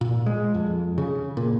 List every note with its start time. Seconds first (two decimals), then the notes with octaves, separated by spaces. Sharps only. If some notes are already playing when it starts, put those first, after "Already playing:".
0.01 A#2
0.26 G#3
0.54 F2
0.98 C#3
1.37 A#2